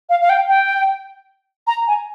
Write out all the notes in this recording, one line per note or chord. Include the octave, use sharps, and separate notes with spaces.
F5
F5
G5
G5
A#5
G#5